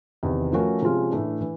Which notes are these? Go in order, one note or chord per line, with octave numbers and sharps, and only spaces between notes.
E2 C3 D#3
F3 A3 C#4 F#4 A#4
C3 F3 G#3 C#4 F4
A2 E3 A3 D4
E3